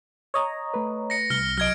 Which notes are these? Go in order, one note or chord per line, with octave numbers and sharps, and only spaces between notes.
C#5 D#5 A#5
A3 B4
A#6 C#7
C2 F6 C#7 G7
F#3 D#5 F6 G#6 D7